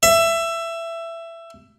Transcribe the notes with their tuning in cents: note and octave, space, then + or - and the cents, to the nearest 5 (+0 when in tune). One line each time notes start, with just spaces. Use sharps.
E5 +15